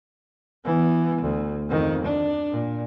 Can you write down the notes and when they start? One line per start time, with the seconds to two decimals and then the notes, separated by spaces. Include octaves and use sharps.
0.64 E3 B3
1.21 D2
1.68 F2 D#3
2.05 D4
2.51 A#2